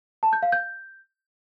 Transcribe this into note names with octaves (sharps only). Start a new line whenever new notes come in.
A5
G6
F5
G6